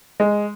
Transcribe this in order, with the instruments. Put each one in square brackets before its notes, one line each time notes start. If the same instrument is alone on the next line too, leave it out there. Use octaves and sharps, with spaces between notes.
[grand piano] G#3